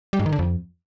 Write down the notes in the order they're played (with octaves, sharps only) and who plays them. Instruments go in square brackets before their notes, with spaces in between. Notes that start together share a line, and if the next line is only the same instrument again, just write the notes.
[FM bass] G3
G#2
D#3
D3
F2